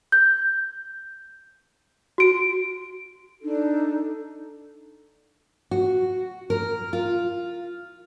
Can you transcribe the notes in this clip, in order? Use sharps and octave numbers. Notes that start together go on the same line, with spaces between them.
G6
F#4 D7
D4 D#4 A4
F#4
A#4
F4